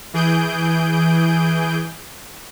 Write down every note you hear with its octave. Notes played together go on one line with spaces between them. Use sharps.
E3 G#4 G6 D7